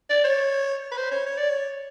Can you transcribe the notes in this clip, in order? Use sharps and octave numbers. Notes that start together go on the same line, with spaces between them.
D5
C#5
B4
C5
C#5
C#5
D5
C#5